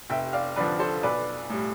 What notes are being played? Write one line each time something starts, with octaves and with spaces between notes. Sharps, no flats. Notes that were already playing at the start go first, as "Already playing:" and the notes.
F1 E5 G5
D5 F5
F2 D3 F3 B4 D5
A4 C5
B1 B4 D5
A2 G3